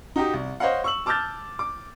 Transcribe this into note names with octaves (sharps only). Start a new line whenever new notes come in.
D#4 F#4 G4 D#6
C2
C5 C#5 D#5 F5 F#5
C#6 E6 F#7
A5 D6 E6 F6 G6 A6
D6